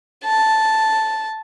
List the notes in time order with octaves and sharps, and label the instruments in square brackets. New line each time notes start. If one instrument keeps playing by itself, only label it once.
[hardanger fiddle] A5